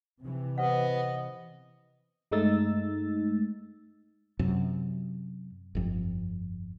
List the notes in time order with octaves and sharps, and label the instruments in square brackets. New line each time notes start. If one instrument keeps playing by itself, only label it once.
[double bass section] C3 E3
[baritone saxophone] B3 [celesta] G4 C5 F#5 [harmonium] D#5
[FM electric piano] G2 G#3 A3 D#4 E6 A6
[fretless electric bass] F#2 C3
G1 F2